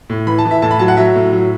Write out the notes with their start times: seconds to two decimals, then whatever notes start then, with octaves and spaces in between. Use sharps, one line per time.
0.10 A2
0.27 E3 B5
0.39 A5
0.45 E3
0.51 E5
0.62 A2 A5
0.71 B5
0.79 F#3 A5
0.88 F#5
0.97 F#3 E5
1.15 A2
1.33 F#3